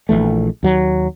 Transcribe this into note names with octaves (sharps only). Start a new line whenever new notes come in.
A#1 F2 E3 A3
D#2 F#3